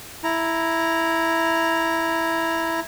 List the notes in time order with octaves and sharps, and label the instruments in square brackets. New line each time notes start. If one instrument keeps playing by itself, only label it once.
[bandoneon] E4 A#5